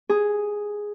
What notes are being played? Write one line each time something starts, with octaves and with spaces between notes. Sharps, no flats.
G#4